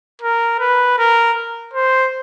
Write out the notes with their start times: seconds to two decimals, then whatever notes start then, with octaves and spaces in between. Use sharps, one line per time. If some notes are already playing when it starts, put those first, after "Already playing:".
0.22 A#4
0.60 B4
0.98 A#4
1.74 C5